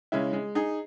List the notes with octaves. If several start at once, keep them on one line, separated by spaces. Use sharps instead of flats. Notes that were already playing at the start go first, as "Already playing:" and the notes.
C#3 G#3 C#4 E4
G#3
D#4 G#4